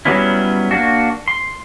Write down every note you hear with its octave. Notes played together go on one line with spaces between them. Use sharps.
F#3 G3 B3 C#4 E4
A#3 D4 F#4
C6